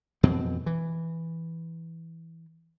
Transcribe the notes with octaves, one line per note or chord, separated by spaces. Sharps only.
F2 B2 E3 C4
E3